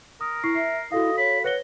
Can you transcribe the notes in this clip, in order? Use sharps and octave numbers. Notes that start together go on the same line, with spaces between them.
A#4 D#6
E4 C#6 C7
E5 C7
E4 F#4 A4 D#5 F5
C#5 B5
B4 C#5 F#5 A#6 G7